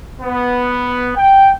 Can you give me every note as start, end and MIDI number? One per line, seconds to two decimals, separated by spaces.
0.21 1.11 59
1.16 1.50 79